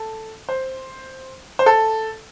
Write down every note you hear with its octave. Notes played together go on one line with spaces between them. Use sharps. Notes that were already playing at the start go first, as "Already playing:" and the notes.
Already playing: A4
C5
C5
A4